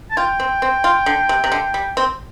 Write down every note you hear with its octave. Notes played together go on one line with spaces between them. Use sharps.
A5
F4 G5
C4
C4
F4
D3
C3
C3
D3
G3
C4